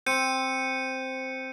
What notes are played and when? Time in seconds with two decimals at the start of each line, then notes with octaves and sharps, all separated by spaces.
0.06 C4 G6 C#7 D#7